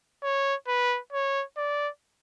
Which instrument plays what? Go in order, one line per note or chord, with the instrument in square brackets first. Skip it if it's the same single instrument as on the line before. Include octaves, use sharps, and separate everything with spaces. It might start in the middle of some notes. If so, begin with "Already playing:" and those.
[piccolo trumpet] C#5
B4
C#5
D5